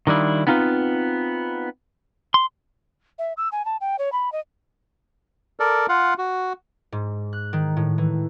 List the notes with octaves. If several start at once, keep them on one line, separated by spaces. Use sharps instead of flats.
D#3 G3 D4 E4 F4
B3 C4 D#4 F4 A4 B4
C6
E5
E6
G#5
A5
G5
C#5
B5
D#5
A4 A#4 D5
F4 F5 F#5
F#4
G#2
F#6
D#3
A2
E3